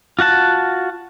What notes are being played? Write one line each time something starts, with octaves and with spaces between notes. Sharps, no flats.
F4 F#4 F#5 A5